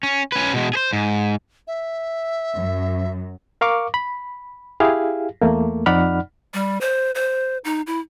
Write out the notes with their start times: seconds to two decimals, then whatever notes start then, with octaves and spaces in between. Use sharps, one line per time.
0.03 C#4
0.32 C#4 B4
0.53 B2 G#3
0.73 G#4 C5
0.93 G#2
1.67 E5
2.54 F#2
3.61 A#4 F5 C#6 D6
3.94 B5
4.80 E4 G4 G#4 F5
5.42 E2 A3 A#3
5.86 F2 D#4 D5 F#5 B5 F6
6.54 G3
6.81 C5
7.15 C5
7.64 D#4
7.87 E4